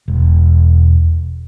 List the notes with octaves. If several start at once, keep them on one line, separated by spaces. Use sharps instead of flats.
E1